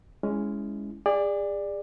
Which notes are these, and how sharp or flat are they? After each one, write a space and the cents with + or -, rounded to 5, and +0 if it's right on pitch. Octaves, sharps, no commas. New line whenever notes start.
G#3 +0 C#4 +15 E4 +5
G#4 -35 D5 +10